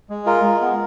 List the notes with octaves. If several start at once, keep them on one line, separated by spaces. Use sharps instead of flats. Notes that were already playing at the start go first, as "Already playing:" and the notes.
G#3
F4 A#4
G#3
B3